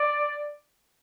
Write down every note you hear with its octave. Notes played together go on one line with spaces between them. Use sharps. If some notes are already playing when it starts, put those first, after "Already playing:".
Already playing: D5